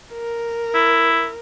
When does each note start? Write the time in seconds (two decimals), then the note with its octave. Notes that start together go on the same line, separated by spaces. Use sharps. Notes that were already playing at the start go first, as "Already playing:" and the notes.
0.13 A#4
0.74 E4